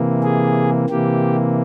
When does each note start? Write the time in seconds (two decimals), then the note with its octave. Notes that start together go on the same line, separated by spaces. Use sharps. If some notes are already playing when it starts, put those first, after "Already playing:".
Already playing: C3 E3 A#3
0.23 G#4
0.89 C3 E3 A#3 G4